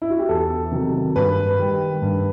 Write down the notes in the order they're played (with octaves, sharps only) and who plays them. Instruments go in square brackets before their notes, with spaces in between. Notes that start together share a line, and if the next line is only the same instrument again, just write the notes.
[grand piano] E4
F#4
G4
E2 A4
C3 D#3 F#3
G2 B4
D#3 G3
G2